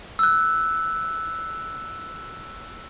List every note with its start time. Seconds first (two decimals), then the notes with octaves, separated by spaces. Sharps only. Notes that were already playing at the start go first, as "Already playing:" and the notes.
0.19 E6 F#6